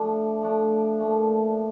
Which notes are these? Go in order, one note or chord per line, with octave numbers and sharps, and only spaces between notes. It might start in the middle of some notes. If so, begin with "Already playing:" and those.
Already playing: F3 A3 D4
F3 A3 D4
A#2 F3 A3